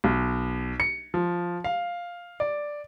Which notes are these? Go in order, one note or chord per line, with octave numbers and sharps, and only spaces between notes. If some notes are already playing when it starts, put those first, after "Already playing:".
B1
C#7
F3
F5
D5